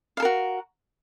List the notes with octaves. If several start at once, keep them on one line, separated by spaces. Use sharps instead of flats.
F#4 A4 A#4 F5